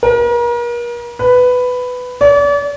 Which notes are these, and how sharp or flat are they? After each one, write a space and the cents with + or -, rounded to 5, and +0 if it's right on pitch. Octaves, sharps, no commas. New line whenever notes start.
A#4 +40
B4 +10
D5 -40